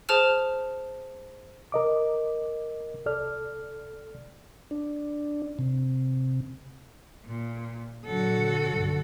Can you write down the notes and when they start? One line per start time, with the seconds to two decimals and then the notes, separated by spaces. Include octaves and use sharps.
0.09 G#4 C5 A5 F6 E7
1.72 A#4 D#5 D6
3.06 C2 A4 D5 F6
4.71 D4
5.59 C3
7.25 A#2
8.06 A#2 D3 F#3 F#4 A4
8.70 B1 G2 D3